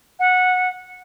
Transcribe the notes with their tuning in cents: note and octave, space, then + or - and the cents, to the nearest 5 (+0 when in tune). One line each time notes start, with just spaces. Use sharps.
F#5 -15